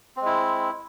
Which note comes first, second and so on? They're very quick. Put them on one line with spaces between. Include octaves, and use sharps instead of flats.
C4 G#3 E4